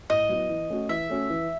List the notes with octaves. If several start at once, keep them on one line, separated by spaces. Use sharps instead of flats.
A2 D#5
F#3 B3 E4
E3
A3 C#4 F#4
E3 E5
A3 C#4 F#4
E3